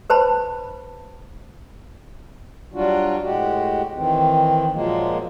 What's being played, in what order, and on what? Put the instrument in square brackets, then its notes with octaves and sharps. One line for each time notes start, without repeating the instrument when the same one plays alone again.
[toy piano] B4 C5 A5 B5
[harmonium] F#3 G3 D4 F4 F#4
A2 G#3 F#4 G4
D#3 E3 C4
A#2 F3 F#3 G#3 A#3